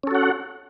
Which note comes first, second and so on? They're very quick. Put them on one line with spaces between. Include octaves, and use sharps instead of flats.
C#4 A4 F#4 F#5